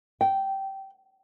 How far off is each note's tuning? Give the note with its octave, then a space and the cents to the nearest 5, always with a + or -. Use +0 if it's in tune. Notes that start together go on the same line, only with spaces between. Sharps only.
G5 -15